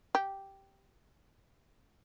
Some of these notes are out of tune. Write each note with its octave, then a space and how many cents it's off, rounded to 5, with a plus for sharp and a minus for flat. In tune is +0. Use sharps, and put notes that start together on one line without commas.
G4 -5